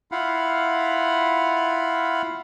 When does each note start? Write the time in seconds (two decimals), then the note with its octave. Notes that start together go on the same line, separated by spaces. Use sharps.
0.12 E4 F4 F5 F#5 B5